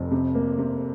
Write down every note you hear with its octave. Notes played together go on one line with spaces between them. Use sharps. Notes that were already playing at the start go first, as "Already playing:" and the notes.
Already playing: F1 F2
C3
A#3
C3